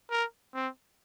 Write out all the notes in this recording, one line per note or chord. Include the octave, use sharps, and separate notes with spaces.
A#4
C4